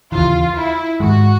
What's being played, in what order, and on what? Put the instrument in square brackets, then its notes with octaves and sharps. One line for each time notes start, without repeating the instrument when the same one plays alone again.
[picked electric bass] D#2 C#3 E3 [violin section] F4
[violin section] E4
[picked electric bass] G#2 D#3 G#3 [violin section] F#4